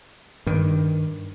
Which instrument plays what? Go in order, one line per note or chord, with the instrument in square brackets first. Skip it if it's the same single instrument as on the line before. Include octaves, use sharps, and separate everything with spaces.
[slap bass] G2 D#3